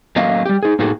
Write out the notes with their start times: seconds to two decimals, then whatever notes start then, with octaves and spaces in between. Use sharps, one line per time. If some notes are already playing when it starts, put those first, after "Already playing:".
0.16 F#3 A3 A#3 C#4 D#5 F5
0.46 G3 G4
0.63 D#4 G#4
0.79 A2 A#3 D#4 F#4 G#4 A4